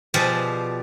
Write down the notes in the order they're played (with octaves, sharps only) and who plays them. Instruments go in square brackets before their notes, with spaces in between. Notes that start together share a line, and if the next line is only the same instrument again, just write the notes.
[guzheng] B2 F3 G4 G#4 D5 F5